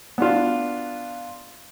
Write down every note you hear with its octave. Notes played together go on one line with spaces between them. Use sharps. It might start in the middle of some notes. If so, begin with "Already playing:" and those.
B3 D4 F4